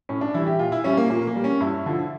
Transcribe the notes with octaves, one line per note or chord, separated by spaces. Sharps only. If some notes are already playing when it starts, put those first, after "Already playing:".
A2 C#4
D4
E3 G3 E4
G4
A#2 F4
E4
G3 C#4
A#3
A#2 A#3
A#3
G3
C#4
G2 E4
D3 F3